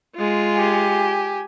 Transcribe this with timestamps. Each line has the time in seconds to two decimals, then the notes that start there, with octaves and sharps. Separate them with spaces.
0.16 G#3 F4
0.56 G4 G#5